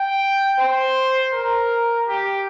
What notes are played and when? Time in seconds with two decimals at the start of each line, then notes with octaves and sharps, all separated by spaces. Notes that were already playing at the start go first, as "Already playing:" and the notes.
Already playing: G5
0.60 C5
1.34 A#4
2.08 G4